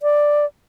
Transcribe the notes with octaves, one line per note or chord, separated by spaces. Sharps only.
D5